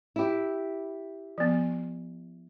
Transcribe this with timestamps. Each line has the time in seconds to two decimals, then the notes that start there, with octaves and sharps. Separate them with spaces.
0.16 E4 G4
1.38 F3 B3